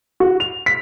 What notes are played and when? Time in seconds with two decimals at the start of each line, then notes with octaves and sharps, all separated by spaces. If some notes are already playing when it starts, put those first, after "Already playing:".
0.20 F#4
0.40 F7
0.66 B6